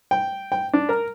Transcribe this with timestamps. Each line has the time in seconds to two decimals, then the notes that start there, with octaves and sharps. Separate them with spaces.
0.11 G5
0.52 G5
0.73 D4
0.89 A#4